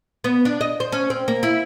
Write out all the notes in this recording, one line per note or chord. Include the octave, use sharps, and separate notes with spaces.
B3
D4
D#5
C5
C#4
C4
A#3
E4